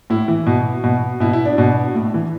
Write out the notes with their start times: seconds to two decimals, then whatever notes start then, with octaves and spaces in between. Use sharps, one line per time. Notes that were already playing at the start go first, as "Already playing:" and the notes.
0.10 A2 E4
0.28 E3
0.47 B2
0.84 B2
1.20 B2 E4
1.33 E4
1.45 D4
1.58 B2
1.95 A2
2.14 E3